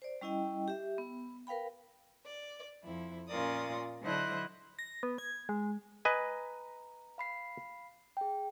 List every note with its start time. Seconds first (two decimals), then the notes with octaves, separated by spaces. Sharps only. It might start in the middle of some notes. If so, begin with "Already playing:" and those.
0.02 C5 D5
0.21 G3 C#4 E4 D#5 G5
0.68 G4 E5
0.98 B3
1.47 A#4 B4 F5 G5 B5
2.26 D5
2.83 F2 E4
3.28 A#2 C#4 F4 A#4 D5 D#6
4.02 D3 F#3 E4 C5 D#5 F#6
4.79 A#6
5.03 B3
5.18 G#6
5.49 G#3
6.05 B4 D#5 G#5 A#5
7.18 F5 B5 C7
8.17 G#4 G5